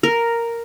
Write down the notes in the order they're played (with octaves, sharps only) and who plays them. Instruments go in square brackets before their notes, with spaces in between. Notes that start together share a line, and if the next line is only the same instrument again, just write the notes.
[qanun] A#4